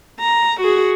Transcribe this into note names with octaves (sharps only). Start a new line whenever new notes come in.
A#5
F#4 G#4